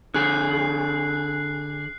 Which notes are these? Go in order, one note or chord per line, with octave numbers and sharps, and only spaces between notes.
D3 G#4 F#6 C7